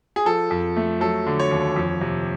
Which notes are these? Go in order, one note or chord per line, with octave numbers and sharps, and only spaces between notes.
G#4
F3 A4
F2
A3
F#3 A4
D3
C#5
D#2
F2
C3